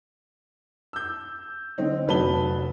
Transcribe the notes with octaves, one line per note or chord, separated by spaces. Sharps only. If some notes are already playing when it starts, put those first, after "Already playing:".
E6 G6
D3 C4 D#4
F1 F#3 B4 A5 G7